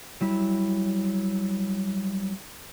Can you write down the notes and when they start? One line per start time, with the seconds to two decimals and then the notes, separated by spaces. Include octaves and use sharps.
0.21 F#3 G3 E4